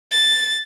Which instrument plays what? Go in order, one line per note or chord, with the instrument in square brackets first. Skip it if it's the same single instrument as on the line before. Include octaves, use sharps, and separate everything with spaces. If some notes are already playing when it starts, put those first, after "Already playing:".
[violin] A6